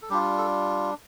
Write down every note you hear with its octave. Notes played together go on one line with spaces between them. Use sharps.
A4
G3 D4 F4 G4
A4